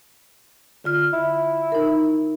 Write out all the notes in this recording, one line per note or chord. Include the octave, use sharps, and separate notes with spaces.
D3 F4 F6
E4
D#4 A#4